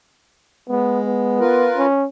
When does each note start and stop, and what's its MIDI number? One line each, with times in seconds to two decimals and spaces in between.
0.69 1.39 56
0.69 1.00 59
1.06 1.69 59
1.40 1.85 65
1.40 1.85 70
1.40 1.85 71
1.77 2.05 61